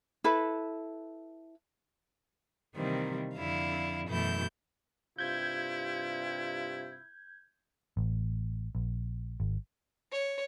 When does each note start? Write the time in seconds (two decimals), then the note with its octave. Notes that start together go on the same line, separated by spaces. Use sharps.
0.24 E4 A4 B4
2.75 C3 D#3 E3 G3 A#3 C4
3.37 F2 D3 E4 F5
4.09 F#2 B2 E3 A3 E4 G6
5.18 G2 C3 E4 F4 G6 G#6
7.97 A1
8.75 A#1
9.40 G#1
10.12 C#5